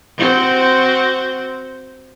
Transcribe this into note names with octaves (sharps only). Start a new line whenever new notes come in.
C4 F#4 C5